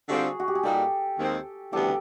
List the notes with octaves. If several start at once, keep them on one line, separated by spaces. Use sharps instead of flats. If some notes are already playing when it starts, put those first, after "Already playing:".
D3 G3 C4 F4 F#4 G#4 A4
F#4
G4
G#4
A#2 G3 A#3 D#4 F#4 G4 A4
D#2 D#3 G#3 C4
D2 C#3 E3 G3 B3 G4 A4